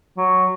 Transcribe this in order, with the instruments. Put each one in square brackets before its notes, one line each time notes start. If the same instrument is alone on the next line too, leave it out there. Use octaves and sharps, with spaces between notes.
[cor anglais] F#3